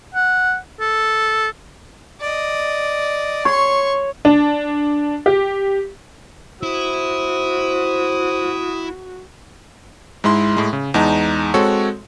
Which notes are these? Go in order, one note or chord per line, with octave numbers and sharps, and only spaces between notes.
F#5
A4
D5 D#5
C#5 C6 C#6
D4
G4
E4 F#4 C5 D#6
G#2 G#3 E4 C6
A2 G#3
C#3
E2 G#3 D#4 A5
G#3 C4 F#4 A4 C#5